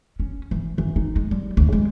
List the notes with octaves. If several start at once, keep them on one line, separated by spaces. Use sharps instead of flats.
C#4
E3
E3
D#4
G#3
G3
D2
G#3